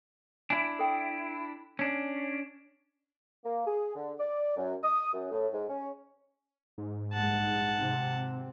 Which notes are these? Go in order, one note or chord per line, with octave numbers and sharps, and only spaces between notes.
D4 E4 G#5
A4 G5
C#4 D4
A#3
G#4
D3
D5
F#2
D#6
F#2
A2
G#2
C#4
G#2
A#1 G2 G#3 F#5 A5
G#1 C3 C4